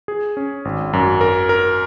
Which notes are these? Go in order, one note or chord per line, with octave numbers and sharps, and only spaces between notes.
G#4
C#4
G#1
F#2
A#4
A#4